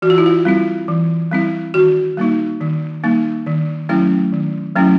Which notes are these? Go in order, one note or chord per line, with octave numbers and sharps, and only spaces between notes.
E3 F#4
F4
E4
F4
G3 C4 E4
E3
G3 C4 E4
D#3 F#4
G3 A#3 D#4
D#3
G3 A#3 D#4
D#3
F#3 A3 C#4 E4
D#3
F#3 A3 C#4 E4